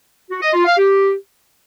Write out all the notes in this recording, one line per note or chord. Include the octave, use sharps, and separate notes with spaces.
F#4
D#5
F4
F5
G4